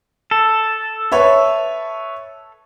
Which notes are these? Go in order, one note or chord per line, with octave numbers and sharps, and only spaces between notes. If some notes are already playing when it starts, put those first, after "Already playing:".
A4
B4 C#5 E5